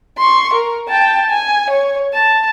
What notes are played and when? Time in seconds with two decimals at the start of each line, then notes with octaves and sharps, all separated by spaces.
0.18 C6 C#6
0.53 A#4
0.89 G5 A5
1.30 G#5
1.70 C#5
2.13 A5